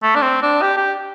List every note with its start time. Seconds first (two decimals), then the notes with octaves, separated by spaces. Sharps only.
0.03 A3
0.15 D4
0.22 C4
0.42 D4
0.62 G4
0.77 G4